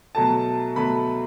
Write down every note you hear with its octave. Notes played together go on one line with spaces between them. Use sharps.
B2 F#3 A3 A5
B2 F#3 A3 B5